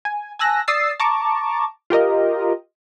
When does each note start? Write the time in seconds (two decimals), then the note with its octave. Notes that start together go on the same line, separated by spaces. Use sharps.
0.05 G#5
0.39 G#5 A5 E6 F#6 A#6
0.68 D5 D#6 E6 A6 C7
1.00 A5 A#5 C#6 D6
1.90 F4 G4 A#4 D#5